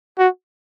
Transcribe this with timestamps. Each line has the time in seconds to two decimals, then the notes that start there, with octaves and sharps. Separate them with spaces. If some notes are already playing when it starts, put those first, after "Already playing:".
0.19 F#4